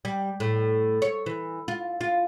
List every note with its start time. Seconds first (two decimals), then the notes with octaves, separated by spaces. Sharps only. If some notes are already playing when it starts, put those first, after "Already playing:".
0.05 G3
0.40 A2
1.02 C#5
1.26 E3
1.68 F4
2.01 F4